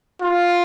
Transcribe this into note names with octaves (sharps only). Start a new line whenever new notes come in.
F4